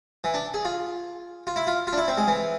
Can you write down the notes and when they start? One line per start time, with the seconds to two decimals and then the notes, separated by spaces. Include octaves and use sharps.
0.24 E3
0.34 D4
0.54 G#4
0.65 F4
1.47 F4
1.56 E4
1.67 F4
1.87 F4
1.93 D4
1.98 E4
2.08 C4
2.18 G#3
2.27 E3